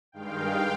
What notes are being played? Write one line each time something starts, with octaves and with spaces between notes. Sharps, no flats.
G2 D#3 G#3 F5 G5